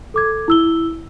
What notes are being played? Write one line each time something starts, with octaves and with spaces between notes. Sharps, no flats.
A4 D6 G#6
E4 E6 G7